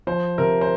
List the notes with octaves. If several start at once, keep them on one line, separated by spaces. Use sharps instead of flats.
F3 C5
C3 A#4
C5